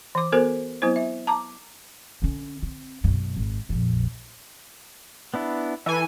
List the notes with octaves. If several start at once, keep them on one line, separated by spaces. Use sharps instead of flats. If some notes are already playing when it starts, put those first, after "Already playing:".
E3 D6
B3 F#4 A4 A#4 C5
F#3 B3 C4 E4 C5
E5
A5 A#5 D6
D3 C#4
C4
F#2 B2
G#1
A#1 F2
B3 D4 E4
E3 A4 G#5